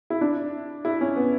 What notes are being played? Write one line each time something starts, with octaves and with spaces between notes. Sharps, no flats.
E4
D4
E4
C#4
B3